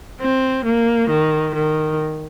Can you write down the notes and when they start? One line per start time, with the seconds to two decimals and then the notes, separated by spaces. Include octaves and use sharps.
0.21 C4
0.65 A#3
1.10 D#3
1.56 D#3